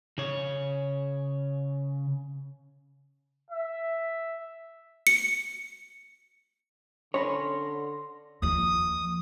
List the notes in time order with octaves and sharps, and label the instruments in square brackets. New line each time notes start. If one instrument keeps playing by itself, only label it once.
[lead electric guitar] C#3 C#5
[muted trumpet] E5
[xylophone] C#7
[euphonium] D3 [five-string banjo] C#4 [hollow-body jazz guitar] C#5 B5 [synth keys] C6 A#6
[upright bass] D#2 F3 [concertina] D#6